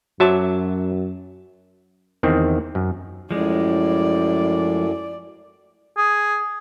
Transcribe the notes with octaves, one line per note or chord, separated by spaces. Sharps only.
F#2 F#3 F#4 C5 E5 A5 D6
E2 D#3 C4
F#2
F#2 A2 F3 G#3 D5
G#4